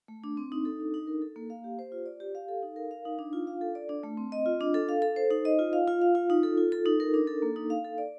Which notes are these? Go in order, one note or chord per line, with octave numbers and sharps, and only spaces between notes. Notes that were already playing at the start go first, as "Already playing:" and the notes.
A3
D4
C4
D#4
A4
D4
D#4
A#4
A4
A#3
F5
G4
C5
F4
D5
G4
F5
A4
D#4
A#4
F5
D#4
D4
F4
F5
A4
D5
D4
A3
C4
D#5
F4
D4
A4
F5
A4
C5
D#4
D#5
F4
F5
F4
F5
F4
D#4
A4
F4
A4
D#4
A#4
D4
A4
A#3
D#4
F5
A4
D5